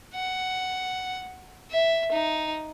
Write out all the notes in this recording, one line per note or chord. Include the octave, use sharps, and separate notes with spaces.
F#5
E5
D#4